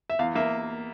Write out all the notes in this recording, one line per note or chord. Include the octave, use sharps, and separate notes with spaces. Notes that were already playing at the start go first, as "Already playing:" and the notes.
E5
E2 F5
A#3 E5